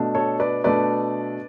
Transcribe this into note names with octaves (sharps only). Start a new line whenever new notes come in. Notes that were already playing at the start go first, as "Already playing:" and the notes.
Already playing: B2 A3 D4
A4 C#5
B4 D5
B2 A3 D4 B4 D5